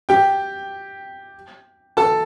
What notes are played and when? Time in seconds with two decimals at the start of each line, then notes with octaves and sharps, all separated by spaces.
0.09 G4 G5
1.97 A4 A5